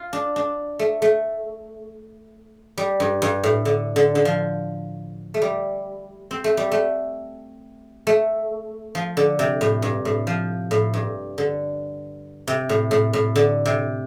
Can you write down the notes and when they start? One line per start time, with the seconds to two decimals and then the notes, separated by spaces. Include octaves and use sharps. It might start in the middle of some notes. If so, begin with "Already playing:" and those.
Already playing: F4
0.13 D4
0.36 D4
0.79 A3
1.02 A3
2.78 G3
3.00 G2
3.22 G2
3.43 A2
3.65 D3
3.96 D3
4.15 D3
4.25 F3
5.34 A3
5.42 G3
6.31 C4
6.44 A3
6.57 G3
6.71 A3
8.07 A3
8.95 F3
9.17 D3
9.39 C3
9.61 A2
9.82 G2
10.05 A2
10.27 F3
10.71 A2
10.94 G2
11.38 D3
12.47 C3
12.69 A2
12.91 A2
13.13 A2
13.36 D3
13.65 C3